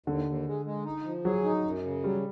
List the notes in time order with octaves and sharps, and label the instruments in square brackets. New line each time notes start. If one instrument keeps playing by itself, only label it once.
[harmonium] D#2 [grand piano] D3
[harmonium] D#2
G#3
G#3
D#4
F3
[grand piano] F#3 [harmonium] G#4
[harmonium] D#4
F#2
C#3
[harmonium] F#3 [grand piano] G3